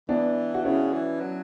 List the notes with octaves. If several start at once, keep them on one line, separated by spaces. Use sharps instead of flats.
E3 B3 D4
F#4
C#3 C#4 E4
E3
F#3